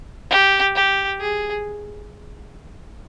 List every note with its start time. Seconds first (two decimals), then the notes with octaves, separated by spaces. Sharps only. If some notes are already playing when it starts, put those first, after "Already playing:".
0.31 G4
0.76 G4
1.21 G#4